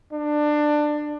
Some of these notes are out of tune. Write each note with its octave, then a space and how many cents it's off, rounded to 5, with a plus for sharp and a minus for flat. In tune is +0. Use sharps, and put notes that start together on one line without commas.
D4 +20